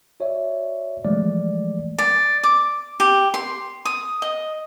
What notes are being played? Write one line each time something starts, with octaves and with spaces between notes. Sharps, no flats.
F#4 C#5 D5 E5
E3 F3 G#3 A3 D5
D5
D6
G4
C6
D#6
D#5